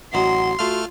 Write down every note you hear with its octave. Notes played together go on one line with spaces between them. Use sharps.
A1 D#3 F#3 F#5 C6
A3 F4 F#4 F6